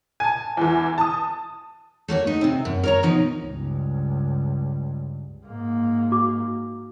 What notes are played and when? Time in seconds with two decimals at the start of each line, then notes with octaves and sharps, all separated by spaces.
0.20 G#5 A5
0.57 E2 E3
0.98 A5 D#6
2.08 A3 A#3 F#4 C#5
2.27 D#4 B4
2.41 C3 C4
2.65 F#2
2.84 A#4 C#5 A#5
3.03 B2 F3 D#4
3.43 C#2 G2
5.46 G#2 A#3
6.12 F#4 D6